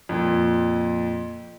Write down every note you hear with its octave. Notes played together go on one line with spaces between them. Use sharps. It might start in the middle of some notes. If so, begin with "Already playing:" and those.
F2 A#2